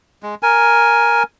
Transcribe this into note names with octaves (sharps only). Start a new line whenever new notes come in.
G#3
A#4 G#5